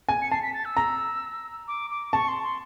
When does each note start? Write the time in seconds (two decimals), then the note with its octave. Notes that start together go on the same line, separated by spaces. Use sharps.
0.09 G#5
0.22 C#7
0.31 A5 C7
0.42 B6
0.54 A6
0.65 E6
0.77 A#5
1.68 D6
1.90 D6
2.12 A5 C#6
2.28 C6
2.42 C6